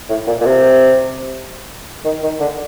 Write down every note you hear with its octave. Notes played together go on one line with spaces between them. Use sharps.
A2
A#2
A#2
C3
D#3
D#3
D3